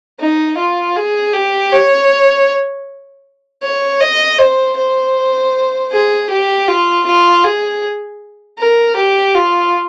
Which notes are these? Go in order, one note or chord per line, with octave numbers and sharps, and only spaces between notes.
D#4
F4
G#4
G4
C#5
C#5
D#5
C5
C5
G#4
G4
F4
F4
G#4
A#4
G4
F4